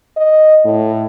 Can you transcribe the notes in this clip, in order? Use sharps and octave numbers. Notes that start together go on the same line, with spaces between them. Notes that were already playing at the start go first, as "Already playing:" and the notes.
D#5
A2